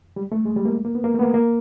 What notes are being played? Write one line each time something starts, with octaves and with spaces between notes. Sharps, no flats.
G3
A3
G#3
G3
A#3
A#3
B3
A#3
A3
B3
A#3
A#3